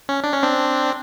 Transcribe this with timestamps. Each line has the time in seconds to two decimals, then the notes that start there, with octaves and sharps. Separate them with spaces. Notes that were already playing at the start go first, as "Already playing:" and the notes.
0.09 C#4
0.24 D4
0.33 C#4
0.42 C4 D4